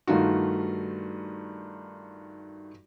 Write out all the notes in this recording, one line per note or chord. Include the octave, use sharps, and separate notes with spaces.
G2 D#3 A3 D#4 F4 F#4